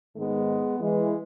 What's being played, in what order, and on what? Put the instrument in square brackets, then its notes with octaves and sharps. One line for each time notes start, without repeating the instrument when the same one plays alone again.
[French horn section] G#2 D#3 G#3 B3
E3 G#3